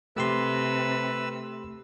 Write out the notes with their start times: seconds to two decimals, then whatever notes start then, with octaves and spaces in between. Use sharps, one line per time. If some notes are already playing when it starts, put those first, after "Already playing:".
0.16 C3 A3 G4 B4 C6 E6